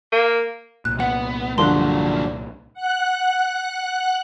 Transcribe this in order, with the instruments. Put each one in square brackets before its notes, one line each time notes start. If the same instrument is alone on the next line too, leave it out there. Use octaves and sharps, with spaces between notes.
[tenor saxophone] A#3
[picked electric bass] C2 A#2 [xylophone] F#6
[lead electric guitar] B3 [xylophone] F#5
[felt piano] G2 D3 F3 [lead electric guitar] F#3 A#3 [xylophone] C6 F#6
[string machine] F#5 F#6